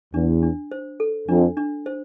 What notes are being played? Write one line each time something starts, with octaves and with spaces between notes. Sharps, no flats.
E2 D4
D4
C5
A4
F2 D4
D4
C5